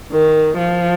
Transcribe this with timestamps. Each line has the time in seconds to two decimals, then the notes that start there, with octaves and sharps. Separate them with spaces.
0.12 D#3
0.58 F3